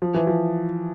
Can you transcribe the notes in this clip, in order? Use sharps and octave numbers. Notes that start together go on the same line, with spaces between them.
F3
E3
F3